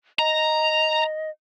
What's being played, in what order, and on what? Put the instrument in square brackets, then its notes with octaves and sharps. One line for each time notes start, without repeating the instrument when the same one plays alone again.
[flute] D#5 [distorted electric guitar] A#5